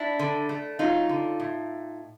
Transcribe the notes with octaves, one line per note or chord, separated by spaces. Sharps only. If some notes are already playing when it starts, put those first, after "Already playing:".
Already playing: D4 E4
D3
A3
F#3 D#4 F4
D3
A2